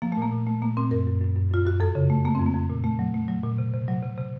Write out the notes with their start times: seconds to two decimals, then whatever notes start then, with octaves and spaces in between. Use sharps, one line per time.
0.02 F3 A#3
0.12 A3
0.17 A#2 A#3
0.32 A#2
0.47 A3
0.62 A#2 A#3
0.77 A#2 C4
0.91 F#2 A#4
1.06 F#2
1.21 F#2
1.36 F#2
1.51 F#2 F4
1.66 F#2 F#4
1.80 F2 A4
1.95 C#3
2.10 A3
2.25 A3 A#3
2.35 F2 C4
2.46 A#3
2.54 F2
2.70 A#2
2.84 A3
2.99 F#3
3.14 A3
3.28 F#3
3.43 A#2
3.58 C3
3.74 C3
3.88 F#3
4.02 C3
4.18 C3